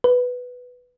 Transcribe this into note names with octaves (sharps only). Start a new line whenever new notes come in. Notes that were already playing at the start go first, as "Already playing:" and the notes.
B4